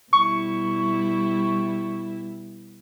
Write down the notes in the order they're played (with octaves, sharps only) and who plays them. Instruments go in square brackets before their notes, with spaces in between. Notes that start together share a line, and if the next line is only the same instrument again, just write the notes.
[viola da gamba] B2 G3 E4 [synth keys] C#6